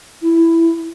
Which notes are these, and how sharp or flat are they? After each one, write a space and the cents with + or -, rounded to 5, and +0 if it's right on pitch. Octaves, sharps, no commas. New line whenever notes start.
E4 +10